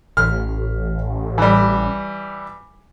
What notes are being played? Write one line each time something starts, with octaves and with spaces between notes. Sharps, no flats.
A1 F6
E3 G3